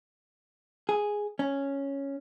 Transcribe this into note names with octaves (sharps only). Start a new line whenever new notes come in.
G#4
C#4